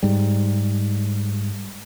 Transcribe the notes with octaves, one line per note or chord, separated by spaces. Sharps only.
G#2 G3